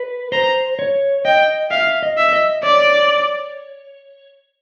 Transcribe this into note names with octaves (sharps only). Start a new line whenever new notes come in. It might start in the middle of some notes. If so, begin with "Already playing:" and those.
Already playing: B4
C5 A#5
C#5
D#5 G5
E5 F5
D#5
E5
D#5
C#5 D5